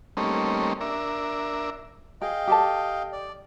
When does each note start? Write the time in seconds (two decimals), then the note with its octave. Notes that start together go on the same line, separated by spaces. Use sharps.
0.17 G3 A3 A#3 C4 C#4 D#4
0.81 D4 A#4 E5
2.22 G#4 D#5 F5 G5
2.48 G4 A4 A5
3.12 D5